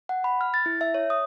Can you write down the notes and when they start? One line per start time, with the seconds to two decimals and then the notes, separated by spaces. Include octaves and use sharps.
0.09 F#5
0.24 B5
0.41 F6
0.54 A6
0.66 E4
0.81 E5
0.94 C#5
1.10 D#6